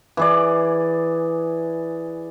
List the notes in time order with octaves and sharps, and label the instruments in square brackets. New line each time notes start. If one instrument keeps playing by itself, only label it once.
[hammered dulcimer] E3 G#4 D5